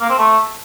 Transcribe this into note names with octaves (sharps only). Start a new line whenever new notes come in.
A#3
C4
A3